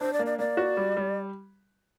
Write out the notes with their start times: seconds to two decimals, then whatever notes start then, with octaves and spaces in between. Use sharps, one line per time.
0.01 D4 C5
0.13 D5
0.19 A#3
0.26 D5
0.39 A#3 D5
0.57 F#4
0.77 G3
0.97 G3